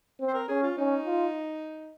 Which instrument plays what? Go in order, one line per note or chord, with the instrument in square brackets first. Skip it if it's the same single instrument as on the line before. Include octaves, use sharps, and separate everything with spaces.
[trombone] C4
[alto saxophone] C5
A#4
[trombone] C#4 [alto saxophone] G#4
[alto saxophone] F4
[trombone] C#4 [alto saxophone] D#4
[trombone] F4